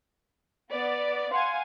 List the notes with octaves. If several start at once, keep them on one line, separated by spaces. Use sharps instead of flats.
B3 D5
F5 F#5 G#5 C6